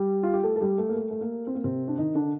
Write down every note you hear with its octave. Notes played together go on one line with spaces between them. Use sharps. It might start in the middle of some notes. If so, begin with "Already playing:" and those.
Already playing: G3 G4
F4
G4
A3 A4
A4
G3 G4
A3
A#3
A3
A3
A#3
C4
A#3
C3 C4
D4
D#3 D#4
D3 D4